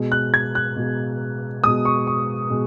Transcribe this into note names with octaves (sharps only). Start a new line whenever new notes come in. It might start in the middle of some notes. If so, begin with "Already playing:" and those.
Already playing: B2 G#3
F#6
G#6
F#6
B2 G#3
B2 G#3 D#6
C#6
C#6
B2 G#3